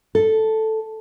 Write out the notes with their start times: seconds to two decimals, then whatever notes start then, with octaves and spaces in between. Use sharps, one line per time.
0.15 A4